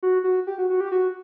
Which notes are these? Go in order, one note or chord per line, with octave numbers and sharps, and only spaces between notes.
F#4
F#4
G4
F#4
F#4
G4
F#4